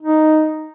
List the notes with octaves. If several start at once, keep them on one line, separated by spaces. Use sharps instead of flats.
D#4